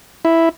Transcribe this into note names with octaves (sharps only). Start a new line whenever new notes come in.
E4